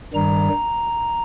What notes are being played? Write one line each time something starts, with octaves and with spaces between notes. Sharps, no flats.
G2 D#3 G3 A#5